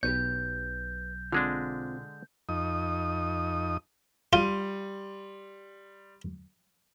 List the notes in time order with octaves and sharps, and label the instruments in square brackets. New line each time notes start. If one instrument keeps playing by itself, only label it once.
[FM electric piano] B1 [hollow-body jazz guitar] G4 B4 C#5 [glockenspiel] G6
[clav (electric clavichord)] D3 G#3 D4 [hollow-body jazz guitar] C4 F4
[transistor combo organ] F2 D#4 D#6
[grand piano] G3 C6 D#7 [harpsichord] F4